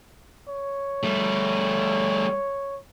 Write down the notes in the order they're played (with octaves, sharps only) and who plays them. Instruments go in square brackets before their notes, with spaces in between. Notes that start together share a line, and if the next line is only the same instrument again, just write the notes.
[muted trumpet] C#5
[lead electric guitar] G3 A3